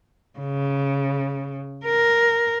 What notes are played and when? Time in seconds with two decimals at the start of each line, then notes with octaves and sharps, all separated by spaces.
0.39 C#3
1.85 A#4